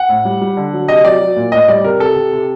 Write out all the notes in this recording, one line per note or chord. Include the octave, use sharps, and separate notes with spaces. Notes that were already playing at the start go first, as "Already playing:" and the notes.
Already playing: F#5
A2
G3
G3
D3
F#3
C3 D#5
F#3 D5
F#3
A#2
A2 D#5
G3 D5
C3 A#4
C3 A4
C3
C3